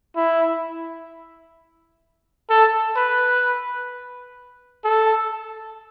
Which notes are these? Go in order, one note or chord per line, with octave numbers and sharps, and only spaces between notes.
E4
A4
B4
A4